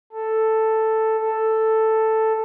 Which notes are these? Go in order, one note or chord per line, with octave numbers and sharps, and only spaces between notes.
A4
A4